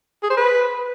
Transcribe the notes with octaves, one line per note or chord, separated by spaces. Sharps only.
G#4
C5
B4